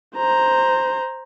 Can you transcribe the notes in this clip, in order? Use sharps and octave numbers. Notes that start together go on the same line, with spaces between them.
C5 A#5